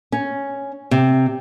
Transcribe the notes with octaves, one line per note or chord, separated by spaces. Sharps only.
C#4
C3